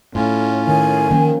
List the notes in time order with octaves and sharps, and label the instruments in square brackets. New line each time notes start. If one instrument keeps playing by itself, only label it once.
[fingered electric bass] A2 [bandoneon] C#4 F4
[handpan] D#3 [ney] G#5
[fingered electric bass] D#3 [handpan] F3 A#3 C#4